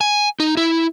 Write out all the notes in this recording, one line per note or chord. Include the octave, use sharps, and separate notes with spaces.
G#5
D#4
E4